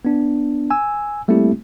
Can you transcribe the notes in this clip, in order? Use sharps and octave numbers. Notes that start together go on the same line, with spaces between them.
B3 D4
G#5 E6
G3 A3 A#3 C4 E4 G4